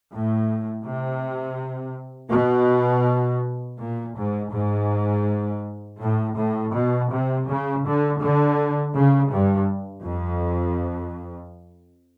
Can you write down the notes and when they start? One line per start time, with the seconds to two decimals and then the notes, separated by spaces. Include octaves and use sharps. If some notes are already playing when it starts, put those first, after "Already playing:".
0.13 A2
0.86 C3
2.33 B2
3.80 A#2
4.18 G#2
4.54 G#2
6.01 A2
6.38 A2
6.74 B2
7.12 C3
7.48 C#3
7.86 D3
8.22 D3
8.95 C#3
9.32 G2
10.05 F2